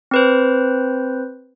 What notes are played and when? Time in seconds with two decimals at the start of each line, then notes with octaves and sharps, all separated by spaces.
0.11 C4 B4 C5